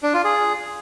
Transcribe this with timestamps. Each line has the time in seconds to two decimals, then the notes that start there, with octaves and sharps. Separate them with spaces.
0.03 D4
0.14 F4
0.24 G#4